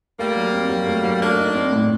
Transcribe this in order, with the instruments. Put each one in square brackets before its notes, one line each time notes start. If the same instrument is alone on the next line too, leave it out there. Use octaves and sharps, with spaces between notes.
[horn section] G3 A#3 [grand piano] A3
[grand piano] F#3
C4
F#3
A3
F#3
[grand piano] A3 [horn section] A#3 D4
[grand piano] D#4
C4
A2